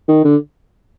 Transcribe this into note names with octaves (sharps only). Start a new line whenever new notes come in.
D#3
D3